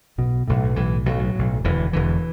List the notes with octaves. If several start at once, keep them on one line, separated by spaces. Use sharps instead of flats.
B1 B2
B1 A2
B1 A2 E3
B1 A2 F#3
B1 A2
E1 E2 D3 E3
E1 E2 D3 E3